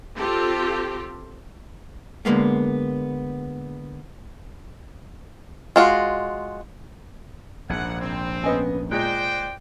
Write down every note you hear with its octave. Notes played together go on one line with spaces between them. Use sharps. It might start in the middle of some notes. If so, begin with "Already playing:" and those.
C4 F4 G4 A4
D3 F3 G#3 A#3 B3
G#3 F4 F#4
A#1 G#2 F#5 G#6
C4
B3 C#4 B4 D#5 G#5
A#2 G#3 C5 D5 G5 F#6 A#6